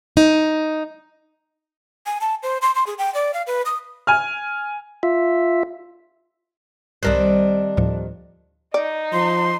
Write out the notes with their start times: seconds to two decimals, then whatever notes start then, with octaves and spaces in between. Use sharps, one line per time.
0.17 D#4
2.06 G#5
2.21 A5
2.43 C5
2.62 C6
2.75 C6
2.87 G#4
2.98 G5
3.14 D5
3.34 F5
3.47 B4
3.66 D#6
4.07 G#5 F6
5.03 F4 E5
7.03 C2 D#3 G3 C4 D4 A#4 F#6
7.77 D2 A2 F3
8.74 D#4 D5
9.13 F3 C6